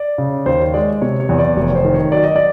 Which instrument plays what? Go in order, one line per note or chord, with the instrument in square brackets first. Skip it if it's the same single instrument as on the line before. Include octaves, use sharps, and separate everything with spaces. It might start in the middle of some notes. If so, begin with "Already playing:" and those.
Already playing: [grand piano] D5
C#3
D#2 C5
C#5
G#3 D5
C3 C#5
C#5
E2
D5
F1 C#5
C5
D#3
C#5
F#3 D5
D#5
D5